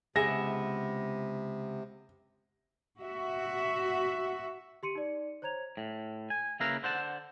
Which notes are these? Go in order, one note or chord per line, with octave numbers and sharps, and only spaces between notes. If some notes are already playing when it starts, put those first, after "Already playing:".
C#2 C3 B3 G#4 E5 A#6
F#4 E5
G4 C6 C#7 D#7
D#4 D5
C5 C#5 A#5 G#6 F7
A2
G#5
C#3 A#3 E4 B4 F5 A#5
D3 C5 F#5 A5